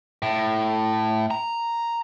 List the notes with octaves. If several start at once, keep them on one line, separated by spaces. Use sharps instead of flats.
A2
A#5